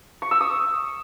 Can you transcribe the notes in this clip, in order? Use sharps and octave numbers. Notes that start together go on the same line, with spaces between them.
C#6
E6
D#6